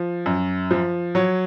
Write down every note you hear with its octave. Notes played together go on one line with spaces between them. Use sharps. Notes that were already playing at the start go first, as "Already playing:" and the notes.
Already playing: F3
F#2
F3
F#3 C#5